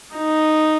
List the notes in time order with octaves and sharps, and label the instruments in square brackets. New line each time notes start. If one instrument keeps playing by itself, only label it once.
[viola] D#4